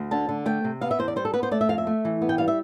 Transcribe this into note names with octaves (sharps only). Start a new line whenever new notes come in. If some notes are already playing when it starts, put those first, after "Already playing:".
Already playing: D2
D3 A5
D3
A3 G5
C3
B3 F5
E5
E2 C5
D5
G3 C5
A4
B3 B4
C5
A3 D5
E5
F2 F5
E5
A3
E3
B3
G5
G3 F5
E5